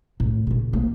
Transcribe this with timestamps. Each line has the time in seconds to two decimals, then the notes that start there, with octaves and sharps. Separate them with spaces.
0.20 A2
0.47 A#2 C#3
0.73 A#3